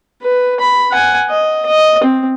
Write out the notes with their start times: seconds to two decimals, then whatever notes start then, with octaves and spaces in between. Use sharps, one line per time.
0.22 B4
0.60 B5
0.92 F#5 G#5
1.29 D#5
1.66 D#5
2.03 C4